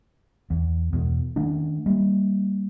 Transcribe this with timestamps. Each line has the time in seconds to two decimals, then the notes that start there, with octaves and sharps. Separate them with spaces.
0.50 E2
0.93 E2 B2
1.36 D#3 A3 C#4 D4
1.86 G3 A#3